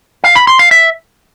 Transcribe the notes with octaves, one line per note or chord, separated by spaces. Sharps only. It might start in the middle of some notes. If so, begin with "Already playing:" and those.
F5
B5
C6
F5
E5